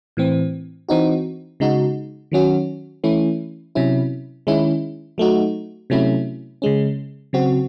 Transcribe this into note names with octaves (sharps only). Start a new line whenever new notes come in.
A2 E3 C4
E3 C4 D#4 F#4
C#3 G#3 D#4 F#4
D#3 F#3 C#4 F#4
E3 A3 C#4 E4
C3 F#3 C#4 E4
D#3 G#3 C#4 E4
F#3 A3 D#4 F#4
C3 F#3 A3 C#4 E4
C#3 G#3 C#4
C#3 F#3 C4 F#4